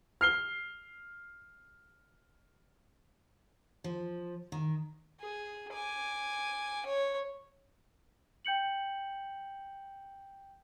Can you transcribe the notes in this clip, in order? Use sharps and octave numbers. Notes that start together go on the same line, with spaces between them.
F6 C7 G7
F3
D#3
G#4
G#5 D6
C#5
G5 G6 C#7 F#7